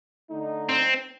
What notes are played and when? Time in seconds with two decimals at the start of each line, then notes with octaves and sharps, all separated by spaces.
0.30 D3 A3 D#4
0.69 C4